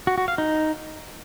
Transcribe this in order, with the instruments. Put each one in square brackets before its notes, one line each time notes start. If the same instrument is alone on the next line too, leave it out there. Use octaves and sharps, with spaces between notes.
[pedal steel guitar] F#4
F#4
F5
D#4